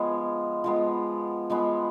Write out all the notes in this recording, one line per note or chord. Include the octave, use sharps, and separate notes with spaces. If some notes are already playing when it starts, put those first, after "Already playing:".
Already playing: F3 G#3 B3
F3 G#3 B3
F3 G#3 B3